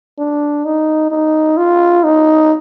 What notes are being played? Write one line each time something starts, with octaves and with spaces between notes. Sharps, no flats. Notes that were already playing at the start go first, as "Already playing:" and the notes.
D4
D#4
D#4
F4
D#4